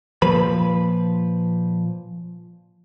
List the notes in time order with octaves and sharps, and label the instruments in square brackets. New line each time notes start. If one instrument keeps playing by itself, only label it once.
[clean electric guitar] A#2 F3 B4 B5